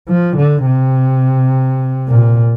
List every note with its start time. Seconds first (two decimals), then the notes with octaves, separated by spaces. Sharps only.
0.09 F3
0.37 D3
0.65 C3
2.09 A#2